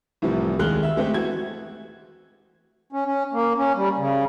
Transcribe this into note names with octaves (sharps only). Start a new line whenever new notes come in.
C2 A2 C3 E3 F3 G3
D#2 G#3 G#4 F6 F#6 G7
E5 E6
G#3 A3 C4 G4 E5
E3 F#4 G#6
C#4
C#4
A#3
C#4
G3
C#3